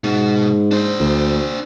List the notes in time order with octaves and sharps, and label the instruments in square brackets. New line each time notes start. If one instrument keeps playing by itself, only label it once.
[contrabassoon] G#2 [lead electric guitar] B2
[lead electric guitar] D4 C5
[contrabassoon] D2